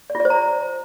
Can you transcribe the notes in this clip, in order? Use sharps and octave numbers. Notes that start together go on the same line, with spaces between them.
D5
F4
D5
C5
A#5